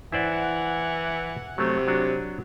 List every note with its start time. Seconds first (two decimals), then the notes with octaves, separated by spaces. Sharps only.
0.12 E3 E4 C5 D5 F#5
1.58 C3 F#3 A3
1.88 F#3 D4 F#4